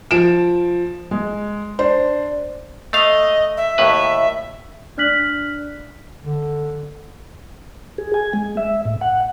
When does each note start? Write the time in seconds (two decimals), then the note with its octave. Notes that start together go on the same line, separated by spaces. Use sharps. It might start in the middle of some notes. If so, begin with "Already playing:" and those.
0.11 F3 D7 E7
1.11 G#3
1.79 D4 C5
2.93 A3 D#5 F5
3.57 E5
3.78 D#2 A2 B4
4.97 D4 D5 F6 F#6 B6 F#7
6.25 D3
7.98 G#4
8.14 G#5
8.33 G#3
8.57 E5
8.85 A2
9.01 F#5